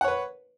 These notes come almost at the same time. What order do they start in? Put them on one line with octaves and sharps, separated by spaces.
F#5 C#5 B4